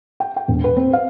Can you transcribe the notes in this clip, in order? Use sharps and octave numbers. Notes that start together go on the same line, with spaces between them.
G5
G5
E1
B4
C4
F5